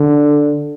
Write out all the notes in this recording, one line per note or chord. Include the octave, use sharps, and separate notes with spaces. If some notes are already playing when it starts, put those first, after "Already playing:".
Already playing: D3